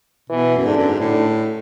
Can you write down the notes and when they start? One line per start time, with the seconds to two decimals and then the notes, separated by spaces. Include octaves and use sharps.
0.30 B2 E3
0.57 F#2
0.65 G#2 D3
0.77 F#2
0.88 G#2
1.00 A2 D3